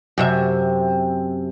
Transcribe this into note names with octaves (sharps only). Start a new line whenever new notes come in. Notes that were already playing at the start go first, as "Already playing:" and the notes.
F#2 C3 E5